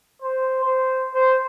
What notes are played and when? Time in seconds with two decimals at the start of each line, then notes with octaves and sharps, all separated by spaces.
0.22 C5
0.64 C5
1.14 C5